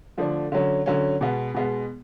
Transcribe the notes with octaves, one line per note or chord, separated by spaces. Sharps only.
D3 F3 A3 D4
D3 F#3 C#4
D3 F#3 C#4
B2 G#3 B3
B2 G#3 B3